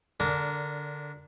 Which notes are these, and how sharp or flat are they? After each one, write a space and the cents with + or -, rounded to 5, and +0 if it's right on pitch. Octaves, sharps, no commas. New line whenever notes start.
D3 +0 D4 -20 A#4 -5